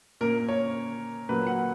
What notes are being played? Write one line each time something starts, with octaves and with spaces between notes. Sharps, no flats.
A#2 A#3 A#4
C#5
A#2 F#3 A#3 B4
F#5